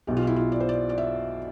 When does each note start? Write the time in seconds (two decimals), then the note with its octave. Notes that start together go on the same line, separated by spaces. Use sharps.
0.07 B1 B2 G4
0.17 F4
0.27 E4
0.36 F4
0.52 D5
0.60 C5
0.69 D5
0.89 D5
0.98 E5